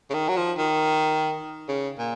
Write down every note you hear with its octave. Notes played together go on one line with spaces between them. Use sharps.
C#3
D#3
F#3
F3
D#3
C#3
A#2